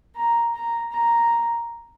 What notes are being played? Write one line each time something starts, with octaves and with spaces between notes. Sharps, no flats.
A#5
A#5
A#5